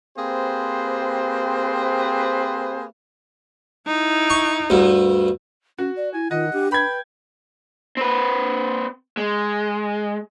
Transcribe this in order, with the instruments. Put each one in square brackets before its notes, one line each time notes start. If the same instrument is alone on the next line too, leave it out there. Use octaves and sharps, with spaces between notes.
[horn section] A#3 C4 G4 G#4 B4 C5
[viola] D#4 E4
[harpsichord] C#6
D2 G2
[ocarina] C#4 [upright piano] F#4
[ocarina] D5
[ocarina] E4 [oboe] G#5
[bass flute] D#3 [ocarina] F4 [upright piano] D#5 [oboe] F#5
[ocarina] D4 [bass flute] G4
[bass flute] B4 [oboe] G5 [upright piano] B5 G#6
[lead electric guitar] C4 B4
G#3